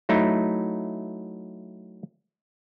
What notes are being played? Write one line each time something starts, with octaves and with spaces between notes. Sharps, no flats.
F#3 A3 D#4 E4